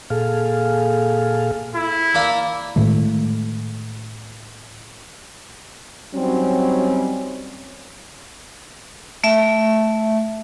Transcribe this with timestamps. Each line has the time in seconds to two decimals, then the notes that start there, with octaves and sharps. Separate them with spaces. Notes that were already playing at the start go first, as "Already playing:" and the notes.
0.10 A#2 G#4 A4 F5
1.75 E4
2.14 A#3 D4
2.76 A2 D#3 G#3 A3
6.14 F#3 G3 C4 C#4 D#4
9.24 A3 E5